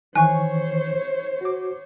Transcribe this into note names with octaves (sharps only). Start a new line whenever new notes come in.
D#3 E3 C5 C#5 G#5 C#6 F#6
F#4 D6